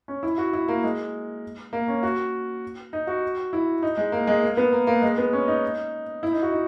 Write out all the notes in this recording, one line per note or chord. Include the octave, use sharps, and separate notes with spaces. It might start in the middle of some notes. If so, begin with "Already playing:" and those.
C#4
E4
F#4
E4
A#3
G#3
A#3
C#4
F#4
D#4
F#4
E4
D#4
G#3
A#3
G#3
A#3
B3
A#3
A#3
G#3
B3
C#4
D#4
E4
D#4
F#4
D#4